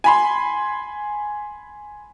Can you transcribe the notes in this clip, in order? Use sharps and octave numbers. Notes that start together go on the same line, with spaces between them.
G#5 B5 C6